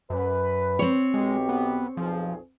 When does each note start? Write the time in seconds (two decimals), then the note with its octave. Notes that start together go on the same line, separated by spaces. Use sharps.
0.10 F#2 B4
0.79 C4 C#5
1.14 B1 G#3 G4
1.49 B3
1.97 B1 F2 F3 G#4